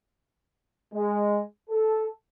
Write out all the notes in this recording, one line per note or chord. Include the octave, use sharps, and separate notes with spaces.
G#3
A4